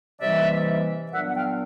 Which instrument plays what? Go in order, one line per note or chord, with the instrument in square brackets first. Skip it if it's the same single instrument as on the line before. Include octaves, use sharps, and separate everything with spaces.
[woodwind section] C3 E3 G3 A#3 D#4 D5 E5
A#2 F#3 B3 D4 E5 F#5
F#5
F5 G5